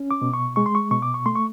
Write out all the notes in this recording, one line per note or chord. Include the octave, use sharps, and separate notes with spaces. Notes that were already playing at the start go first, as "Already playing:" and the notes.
Already playing: C#4
D6
B2
C#6
G#3 C#6
C6
C#6
B2 C#6
D6
C#6
A3 C6
C#6